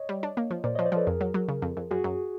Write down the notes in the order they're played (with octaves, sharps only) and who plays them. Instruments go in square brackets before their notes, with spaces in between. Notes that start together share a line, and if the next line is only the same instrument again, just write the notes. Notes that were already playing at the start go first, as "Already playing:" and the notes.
Already playing: [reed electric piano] C#5 D#5
[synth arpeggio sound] G3
D4
A#3
F3
[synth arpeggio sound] A#2 [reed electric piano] C5 D5
[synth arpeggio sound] F3 [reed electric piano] C#5 D#5
[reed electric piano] C5 D5
[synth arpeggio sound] F3 [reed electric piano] A4 B4
[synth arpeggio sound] F2 [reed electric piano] G#4 A#4
[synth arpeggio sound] F#3
F#3
C#3
F2
F2
[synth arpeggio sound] F#2 [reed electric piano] F#4 G#4
[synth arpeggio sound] F#2